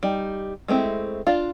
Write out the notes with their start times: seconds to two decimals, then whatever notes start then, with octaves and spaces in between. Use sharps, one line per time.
0.03 G3 D#4
0.68 G#3 A3 C4 E4
1.27 D4 F4